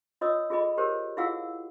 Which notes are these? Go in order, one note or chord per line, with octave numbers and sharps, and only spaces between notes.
F4 C#5 D#5 D#6 E6
F4 G#4 A4 D#5 B5
G4 G#4 A#4 C5 C#5
E4 F4 G#4 F5 F#5 E6